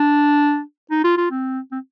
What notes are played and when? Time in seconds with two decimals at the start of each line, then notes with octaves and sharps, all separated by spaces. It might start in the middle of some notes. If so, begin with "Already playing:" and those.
Already playing: D4
0.90 D#4
1.04 F4
1.17 F4
1.31 C4
1.72 C4